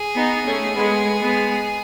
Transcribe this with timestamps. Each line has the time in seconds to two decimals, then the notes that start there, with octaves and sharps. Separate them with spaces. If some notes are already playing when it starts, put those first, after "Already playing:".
Already playing: G#4
0.15 B3 D#4
0.45 A3 C#4
0.75 G#3 B3
1.19 G#3 B3